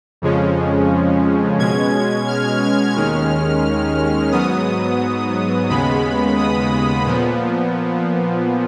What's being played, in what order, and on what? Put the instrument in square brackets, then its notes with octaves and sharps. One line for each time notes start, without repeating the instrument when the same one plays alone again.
[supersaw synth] F2 C#3 F3 G#3 C#4
B2 G#3 C#4 G#6
F6
F6
D#2 D#3 G#3 C#4 F6
G#2 F#3 B3 D#6
D#2 C#3 G#3 B3 B5
D#6
A#2 F3 B3